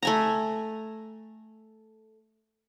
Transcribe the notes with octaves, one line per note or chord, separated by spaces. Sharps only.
A3 G#5 A#5